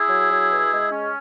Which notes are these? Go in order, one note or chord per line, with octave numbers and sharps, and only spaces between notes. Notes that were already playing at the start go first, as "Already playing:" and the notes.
Already playing: E4 G#4
F#3
F#3
B2
G#3
C#4